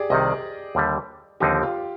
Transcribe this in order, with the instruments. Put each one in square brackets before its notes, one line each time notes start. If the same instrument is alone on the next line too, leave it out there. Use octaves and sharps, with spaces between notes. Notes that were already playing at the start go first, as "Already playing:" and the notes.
Already playing: [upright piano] G4 G#4 D5
[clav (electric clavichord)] C2 C3 D#3 [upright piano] D#5
[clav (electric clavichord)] D#2 D3 G3
[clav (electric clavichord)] D#2 D3 F3 C4 D#4 [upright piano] G4
[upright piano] F4